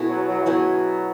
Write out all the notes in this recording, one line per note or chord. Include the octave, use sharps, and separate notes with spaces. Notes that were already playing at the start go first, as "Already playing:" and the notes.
Already playing: B2 A3 E4 G#4
F#3
F#3
E3
B2 F#3 A3 E4 G#4